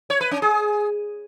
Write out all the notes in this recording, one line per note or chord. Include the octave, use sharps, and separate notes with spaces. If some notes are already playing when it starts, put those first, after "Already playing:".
C#5
B4
C#4
G#4